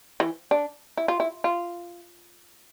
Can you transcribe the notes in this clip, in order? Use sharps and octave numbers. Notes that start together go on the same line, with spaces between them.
E3
D4
E4
F4
E4
F4